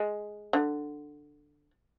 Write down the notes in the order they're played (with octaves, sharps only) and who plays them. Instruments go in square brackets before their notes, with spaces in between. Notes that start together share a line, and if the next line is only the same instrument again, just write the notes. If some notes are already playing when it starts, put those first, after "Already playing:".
Already playing: [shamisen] G#3
D3